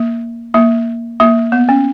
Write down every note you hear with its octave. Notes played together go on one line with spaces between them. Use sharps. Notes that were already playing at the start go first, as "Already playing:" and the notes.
Already playing: A#3
A#3
A#3
B3
C#4